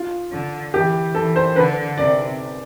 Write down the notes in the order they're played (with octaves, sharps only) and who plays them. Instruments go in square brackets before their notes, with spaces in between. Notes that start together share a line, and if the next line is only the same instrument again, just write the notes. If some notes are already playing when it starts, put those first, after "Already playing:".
Already playing: [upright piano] F4
[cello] D3
[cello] E3 [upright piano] G4
[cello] E3 [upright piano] A4
[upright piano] C5
[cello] D3 [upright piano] B4
[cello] C3 [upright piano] D5